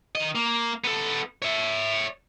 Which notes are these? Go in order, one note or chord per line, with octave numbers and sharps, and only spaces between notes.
D#3 D#5
A#3
B3 A4
C#5 E5